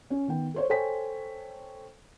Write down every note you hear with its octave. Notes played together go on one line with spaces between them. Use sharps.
C#4
D#3 B3 G5
A4 C5 C#5
A4 C5 C#5 G5 G#5 B6